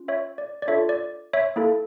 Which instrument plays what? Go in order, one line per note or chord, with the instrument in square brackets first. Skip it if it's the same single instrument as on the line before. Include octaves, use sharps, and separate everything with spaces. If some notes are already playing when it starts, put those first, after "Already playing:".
Already playing: [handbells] C#4 F4
C#5 E5
D5
D5
D4 F4 A4 C#5 E5
D5
C#5 E5
A#3 E4 A4